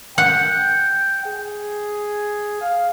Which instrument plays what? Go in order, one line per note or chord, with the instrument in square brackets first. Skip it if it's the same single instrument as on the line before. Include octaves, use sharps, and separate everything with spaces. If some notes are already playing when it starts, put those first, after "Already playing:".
[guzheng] F#5 [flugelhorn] G5
[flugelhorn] G#4
F5